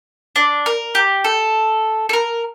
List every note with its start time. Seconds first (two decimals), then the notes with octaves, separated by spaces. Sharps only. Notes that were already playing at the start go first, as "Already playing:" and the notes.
0.36 D4
0.66 A#4
0.95 G4
1.24 A4
2.09 A4
2.13 A#4